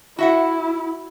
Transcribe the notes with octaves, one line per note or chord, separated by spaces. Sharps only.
E4 F#4 E5 F#5